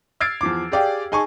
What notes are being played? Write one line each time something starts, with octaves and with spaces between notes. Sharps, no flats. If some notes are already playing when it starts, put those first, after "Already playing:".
E6 F6 G#6 A6 C7 D7
E2 F3 D6
G4 G#4 D5 F5 G5
D#4 G#4 G#5 A5 C#6